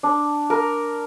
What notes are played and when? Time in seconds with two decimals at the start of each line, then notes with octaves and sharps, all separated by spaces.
0.03 D4
0.50 A#4